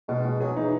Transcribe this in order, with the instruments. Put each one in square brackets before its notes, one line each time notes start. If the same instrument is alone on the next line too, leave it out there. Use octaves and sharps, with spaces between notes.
[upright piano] B2 [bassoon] G#3
[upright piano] B2
[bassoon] F#3 [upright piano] G#4
[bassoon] E3 [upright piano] D#4